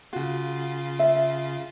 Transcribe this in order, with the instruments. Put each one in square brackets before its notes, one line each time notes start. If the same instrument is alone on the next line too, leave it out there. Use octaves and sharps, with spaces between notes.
[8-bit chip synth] C#3 F4 [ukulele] F#4
[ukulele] E5